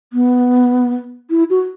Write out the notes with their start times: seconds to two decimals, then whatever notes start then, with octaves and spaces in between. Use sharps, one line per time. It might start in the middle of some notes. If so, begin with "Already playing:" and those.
0.13 B3
1.30 E4
1.50 F#4